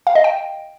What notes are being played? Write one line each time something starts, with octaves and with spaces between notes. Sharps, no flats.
F5
D#5
G5